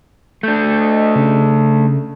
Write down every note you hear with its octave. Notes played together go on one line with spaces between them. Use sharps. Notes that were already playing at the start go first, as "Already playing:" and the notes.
A3 D4 G6
D#5
C#3